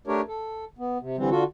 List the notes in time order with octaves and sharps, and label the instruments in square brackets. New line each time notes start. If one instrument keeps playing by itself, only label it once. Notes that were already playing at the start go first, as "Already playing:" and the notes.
[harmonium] A3 D4 G4 A#4 C#5
A4
B3
C3
D3 E3 G3 C4
D3 F4 F#4 A4